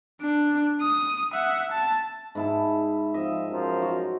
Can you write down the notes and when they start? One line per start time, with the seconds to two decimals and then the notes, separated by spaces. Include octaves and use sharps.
0.21 D4
0.81 D#6
1.33 E5 F#5
1.71 A5
2.35 G#2 E4 A5
3.14 F3 C4 D#5 E5
3.48 F#2 F3 A#4
3.82 F#4